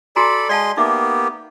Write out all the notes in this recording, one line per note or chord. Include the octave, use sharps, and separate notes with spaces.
F#4 A4 D5 G#5 A#5 B5
G#3 D5 D#5 F5 A5 C6
A#3 B3 D#4 G4 E5 D6